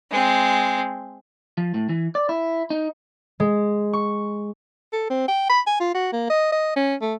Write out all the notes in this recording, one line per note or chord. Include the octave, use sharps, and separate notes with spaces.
G#3 C4
F3
A2
E3
D5
E4
D#4
G#3
C#6
A4
C4
G5
B5
G#5
F4
F#4
A#3
D#5
D#5
C#4
A3